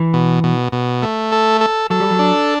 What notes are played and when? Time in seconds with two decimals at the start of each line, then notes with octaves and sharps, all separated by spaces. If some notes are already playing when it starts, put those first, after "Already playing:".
Already playing: E3
0.13 B2
0.44 B2
0.72 B2
1.02 A3
1.32 A4
1.61 A4
1.90 F#3 A4
2.00 G3
2.10 F#3
2.19 D4